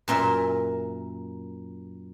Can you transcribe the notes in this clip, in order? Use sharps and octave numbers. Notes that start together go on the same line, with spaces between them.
F#2 A#2 A#4 E5